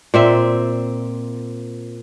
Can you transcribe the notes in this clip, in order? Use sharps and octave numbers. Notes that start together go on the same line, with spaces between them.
A#2 C4 E5